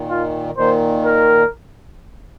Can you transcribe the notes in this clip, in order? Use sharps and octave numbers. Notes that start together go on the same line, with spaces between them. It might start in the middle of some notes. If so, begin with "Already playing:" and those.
Already playing: A#2 D#3
F4
A#2 D#3 C5
A#4